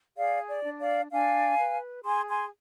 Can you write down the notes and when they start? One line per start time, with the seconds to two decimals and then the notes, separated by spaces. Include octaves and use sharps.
0.17 G#4 D5 F5
0.48 D5
0.64 D4
0.80 D5 F5
1.11 D4 F5 G#5
1.58 B4
2.05 G#4 G#5 C6
2.28 G#5 C6